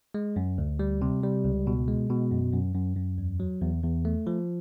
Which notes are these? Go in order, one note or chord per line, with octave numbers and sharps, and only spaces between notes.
G#3
F#2
D2
G3
C3
G3
C#2
B2
G#3
B2
F#2
F#2
F#2
F#2
E2
F#3
E2
E2
A3
F3